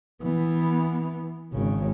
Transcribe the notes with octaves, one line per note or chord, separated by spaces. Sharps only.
E3 B3
G#1 C#3